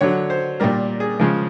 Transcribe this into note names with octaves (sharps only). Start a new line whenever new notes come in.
D3 F#3 C#5
C5
A#2 G3 A#4
G#4
C#3 F3 G#3